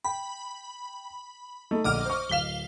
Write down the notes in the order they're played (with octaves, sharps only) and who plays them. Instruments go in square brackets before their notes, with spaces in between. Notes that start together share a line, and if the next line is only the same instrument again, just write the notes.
[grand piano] G5 [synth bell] B5
[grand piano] A3 D#4
[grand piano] A#1 D3 [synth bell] D#5 D6 F6
[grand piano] C5 C#6
[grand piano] D1 B6 E7 [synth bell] F5 G7